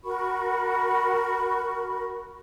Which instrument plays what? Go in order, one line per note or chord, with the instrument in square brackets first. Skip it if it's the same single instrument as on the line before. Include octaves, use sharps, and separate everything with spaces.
[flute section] F#4 A#4 B5 C#6